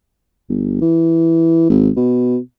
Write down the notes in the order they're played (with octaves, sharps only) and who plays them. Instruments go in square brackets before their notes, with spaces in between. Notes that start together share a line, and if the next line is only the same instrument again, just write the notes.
[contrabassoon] G1
E3
G#1
B2